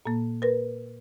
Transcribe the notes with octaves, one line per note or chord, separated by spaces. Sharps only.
A#2 A#3
A#4 B4